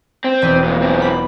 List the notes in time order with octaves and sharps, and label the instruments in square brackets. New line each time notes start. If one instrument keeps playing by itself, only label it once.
[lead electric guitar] C4
[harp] E1 B4 D#7
[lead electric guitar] F2 A#2
F#2 C4
[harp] B5